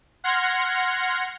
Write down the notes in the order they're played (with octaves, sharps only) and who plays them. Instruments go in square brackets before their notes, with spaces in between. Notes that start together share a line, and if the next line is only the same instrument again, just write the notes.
[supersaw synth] F#5 C6 F6 G#6 A#6 C#7